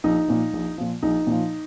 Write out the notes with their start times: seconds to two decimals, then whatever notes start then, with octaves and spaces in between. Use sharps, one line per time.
0.04 A#1 D#4
0.28 A#2 F3
0.53 A#1
0.78 A#2 F3
1.03 A#1 D#4
1.27 A#2 F3